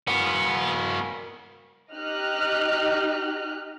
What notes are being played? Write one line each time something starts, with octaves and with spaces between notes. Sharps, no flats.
A#3 B3 F#4
D#4 G4 D#5 F6 F#6